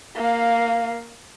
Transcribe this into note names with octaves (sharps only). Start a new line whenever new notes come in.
A#3 F5